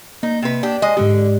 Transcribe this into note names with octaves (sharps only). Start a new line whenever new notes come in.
A#3 D#4
C3 B4
D4 G4
G#3 D#5
G#2 D3 G#3 G4